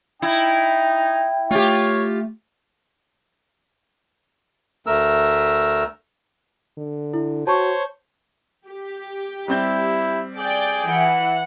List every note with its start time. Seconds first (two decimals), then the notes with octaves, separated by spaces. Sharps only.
0.22 D#4 E4 G5
1.51 A3 F4 G4 C#5
4.87 D2 A3 A#4 E6
6.78 D3
7.14 E4
7.47 F#4 C5 C#5 A5 C#6
8.67 G4
9.48 G3 C4 E4 G6
10.37 G#4 D5 G5
10.88 E3 F#5